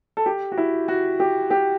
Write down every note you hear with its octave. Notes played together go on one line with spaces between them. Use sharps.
A4
G4
F#4
E4
F#4
G4
G4